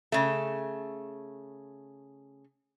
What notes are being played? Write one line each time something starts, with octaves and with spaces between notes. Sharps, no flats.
C#3 A3